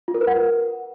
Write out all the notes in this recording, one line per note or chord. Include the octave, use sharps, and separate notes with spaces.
F4
A#4
B4
F#5
A#4